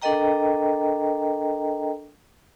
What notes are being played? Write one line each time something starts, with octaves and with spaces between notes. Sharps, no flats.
D4 A4 A#4 D#5 G5 A#5